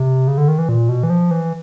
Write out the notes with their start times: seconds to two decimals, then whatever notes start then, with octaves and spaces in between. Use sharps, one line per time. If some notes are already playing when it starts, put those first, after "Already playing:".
Already playing: C3
0.28 C#3
0.38 D3
0.48 D#3
0.59 E3
0.69 A#2
0.89 B2
1.03 E3
1.10 F3
1.31 E3